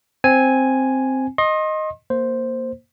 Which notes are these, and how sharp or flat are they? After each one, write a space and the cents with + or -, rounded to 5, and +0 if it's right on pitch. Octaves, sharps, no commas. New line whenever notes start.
C4 +0 G#5 +0
D#5 +0 C6 +35
A#3 +0 C5 +0